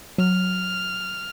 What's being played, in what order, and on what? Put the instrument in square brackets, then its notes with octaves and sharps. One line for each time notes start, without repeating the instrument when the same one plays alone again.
[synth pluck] F#3 [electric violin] F6